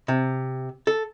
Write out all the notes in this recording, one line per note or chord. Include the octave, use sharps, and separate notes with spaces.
C3
A4